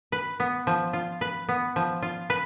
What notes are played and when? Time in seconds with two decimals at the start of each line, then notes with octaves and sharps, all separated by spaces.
0.12 B4
0.40 B3
0.67 F3
0.93 F4
1.21 B4
1.49 B3
1.76 F3
2.02 F4
2.30 B4